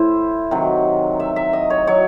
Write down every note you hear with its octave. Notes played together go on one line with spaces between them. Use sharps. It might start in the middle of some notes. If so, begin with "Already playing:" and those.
Already playing: A2 E4 C5
C3 D#3 F#3
E5
E5
D#5
C#5
F#3 C#5